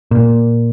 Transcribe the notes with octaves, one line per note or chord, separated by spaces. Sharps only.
A#2